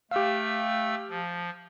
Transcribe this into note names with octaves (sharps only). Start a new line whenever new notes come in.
A3 G4 F5 E6
F3